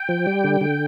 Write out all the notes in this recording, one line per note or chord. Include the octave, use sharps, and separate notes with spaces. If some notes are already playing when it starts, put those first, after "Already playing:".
Already playing: G5
F3
G3
D3
D3